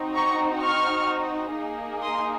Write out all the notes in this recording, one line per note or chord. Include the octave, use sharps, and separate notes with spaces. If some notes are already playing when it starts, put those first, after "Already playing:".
Already playing: C4 D#4 F#4
A#5 C#6
C#6 F6
A#3 D#4 G#4
C6 D#6